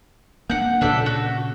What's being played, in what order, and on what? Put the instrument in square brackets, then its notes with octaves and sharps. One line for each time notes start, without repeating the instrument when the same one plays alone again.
[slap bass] A#3 D4 [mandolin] F#5 G6
[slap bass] A#2 C#3 [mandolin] D4 A4 E5
[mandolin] F#4